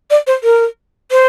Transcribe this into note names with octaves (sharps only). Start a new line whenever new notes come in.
D5
C5
A#4
C5